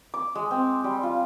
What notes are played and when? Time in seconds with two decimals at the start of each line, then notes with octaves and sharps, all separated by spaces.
0.14 D6
0.35 G#3
0.51 C4
0.84 G3
1.03 F4